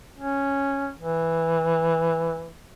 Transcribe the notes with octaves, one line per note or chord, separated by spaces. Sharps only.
C#4
E3